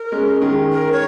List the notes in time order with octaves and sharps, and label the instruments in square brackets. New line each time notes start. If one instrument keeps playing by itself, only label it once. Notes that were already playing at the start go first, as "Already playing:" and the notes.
Already playing: [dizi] A#4
[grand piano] G#3 C#4
D#3 G#3
[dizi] A#4
C#5